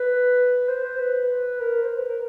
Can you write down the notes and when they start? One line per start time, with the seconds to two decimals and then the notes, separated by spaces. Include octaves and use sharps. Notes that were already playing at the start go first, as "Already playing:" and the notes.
Already playing: B4
0.69 C5
0.84 C5
0.99 B4
1.60 A#4
1.83 C5
1.96 B4
2.08 A#4